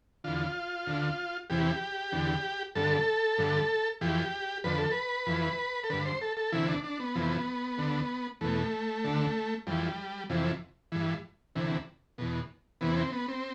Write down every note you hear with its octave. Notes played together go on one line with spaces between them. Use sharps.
E2 D3 F4
D2 D3
E2 C3 E3 G4
E2 D3
G2 D3 A4
G2 D3
F2 E3 G4
F2 D3 B4
A4
B4
F2 E3
A4
G2 D3 B4
C5
A4
A4
D2 C3 E3 E4
D4
D4
B3
F2 C3 E3
D2 D3
E2 B2 A3
D2 D3
F2 E3 G3
F2 C3 E3
G2 E3
D2 C3 E3
E2 B2
E2 C3 E3 B3
C4
B3
C4